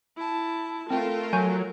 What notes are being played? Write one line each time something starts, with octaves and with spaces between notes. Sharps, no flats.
E4 A5
A3 C4 F4 A4 A#4 G5
F#3 G#5 C#6 G6